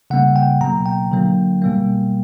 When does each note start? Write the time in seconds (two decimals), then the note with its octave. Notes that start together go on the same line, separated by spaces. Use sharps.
0.10 C#3 G3 A#3 F#5
0.36 G5
0.61 B2 F#3 A#3 A#5
0.86 G5
1.12 D3 F#3 A#3
1.62 B2 G3 A#3